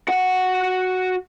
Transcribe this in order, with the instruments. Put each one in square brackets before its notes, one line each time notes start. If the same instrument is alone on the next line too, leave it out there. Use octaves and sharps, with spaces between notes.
[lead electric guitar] F#4 F#5